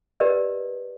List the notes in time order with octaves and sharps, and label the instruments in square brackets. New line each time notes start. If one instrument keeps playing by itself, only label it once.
[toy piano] G4 A#4 B4 D5 D#5